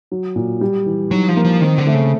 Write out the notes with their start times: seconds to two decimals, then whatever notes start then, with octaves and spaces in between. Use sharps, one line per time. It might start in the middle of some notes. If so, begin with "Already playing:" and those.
0.11 F#3
0.36 A#2
0.61 G3
0.86 E3
1.11 F#3 D#4
1.28 F3
1.37 A#3
1.45 F3
1.61 D#3 C4
1.78 D3
1.87 A3
1.94 C#3